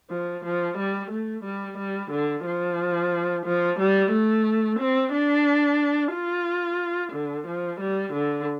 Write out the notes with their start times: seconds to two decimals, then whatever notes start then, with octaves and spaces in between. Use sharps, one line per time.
0.11 F3
0.45 F3
0.78 G3
1.11 A3
1.44 G3
1.78 G3
2.11 D3
2.45 F3
3.46 F3
3.79 G3
4.12 A3
4.79 C4
5.13 D4
6.13 F4
7.13 D3
7.47 F3
7.80 G3
8.13 D3